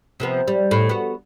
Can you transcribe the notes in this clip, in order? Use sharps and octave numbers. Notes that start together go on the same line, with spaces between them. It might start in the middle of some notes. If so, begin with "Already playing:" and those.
C3 F3 B3
G3
A2
B3 F#4